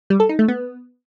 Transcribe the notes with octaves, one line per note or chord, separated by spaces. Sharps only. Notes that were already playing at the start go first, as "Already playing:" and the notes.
G3
A4
D#4
A3
B3